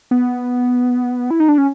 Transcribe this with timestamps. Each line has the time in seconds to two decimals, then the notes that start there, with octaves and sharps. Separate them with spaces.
0.11 B3
1.31 E4
1.40 D#4
1.48 D4
1.58 C#4